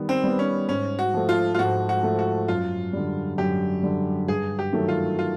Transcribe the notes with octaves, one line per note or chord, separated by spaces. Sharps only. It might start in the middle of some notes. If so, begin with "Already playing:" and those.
Already playing: D#3 G3 B3
C4
G3 B3
C#4
G#2 C#4
F#4
F3 A3
F4
F4
G#2 F#4
F#4
F3 A3
F#4
F#2 F4
D3 G3
F#2 G4
D3 G3
G2 G#4
G4
D#3 F#3 A3
F4
F4